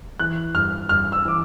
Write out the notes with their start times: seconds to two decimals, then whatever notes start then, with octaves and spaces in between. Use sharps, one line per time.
0.20 E3 F#6
0.54 G2 F6
0.89 G2 F6
1.12 E6
1.25 E3 D6